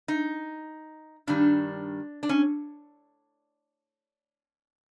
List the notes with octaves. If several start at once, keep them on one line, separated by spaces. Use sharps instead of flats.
D#4
G2 D#3 G3 D4
D4
C#4